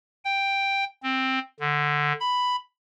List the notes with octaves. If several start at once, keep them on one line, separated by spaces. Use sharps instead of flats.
G5
C4
D3
B5